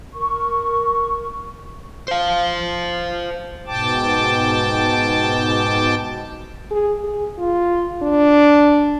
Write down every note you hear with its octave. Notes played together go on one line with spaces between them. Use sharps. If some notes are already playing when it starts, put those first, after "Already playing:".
A#4 C#6
C5 F5
G#2 B2 G5 A5 D6
G#4
G#4
F4
D4